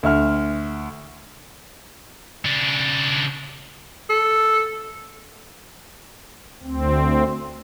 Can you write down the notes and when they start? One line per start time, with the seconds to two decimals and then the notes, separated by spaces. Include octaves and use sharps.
0.03 D2 E5 F6
2.45 C#3 D4
4.10 A4
6.63 D2 C4